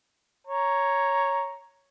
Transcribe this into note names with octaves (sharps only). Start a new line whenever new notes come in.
C#5 A#5